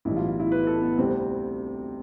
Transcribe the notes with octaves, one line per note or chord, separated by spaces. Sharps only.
B1 A2 E3 G3 E4
F4
F4
E4
B4
A4
B3
D2 C3 G3 C4